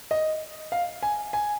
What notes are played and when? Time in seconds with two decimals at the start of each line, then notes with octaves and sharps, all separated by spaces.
0.11 D#5
0.72 F5
1.03 G#5
1.33 G#5